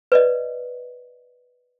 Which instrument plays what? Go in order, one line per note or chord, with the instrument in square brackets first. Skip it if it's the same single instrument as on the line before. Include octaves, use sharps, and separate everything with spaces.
[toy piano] B4 D5 D#5